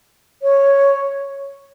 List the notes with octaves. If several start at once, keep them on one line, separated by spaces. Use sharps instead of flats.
C#5